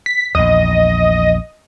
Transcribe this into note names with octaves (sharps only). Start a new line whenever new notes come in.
B6
A#1 E2 D#5